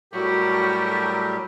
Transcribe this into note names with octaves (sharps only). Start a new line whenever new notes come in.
A2 F#3 G3 F#4 G4 A4 A#4